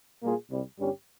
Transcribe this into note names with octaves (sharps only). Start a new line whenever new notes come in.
A#2 G3 A#3 F4 G#4
C2 C3 G3
G1 G2 G3 C#4 G4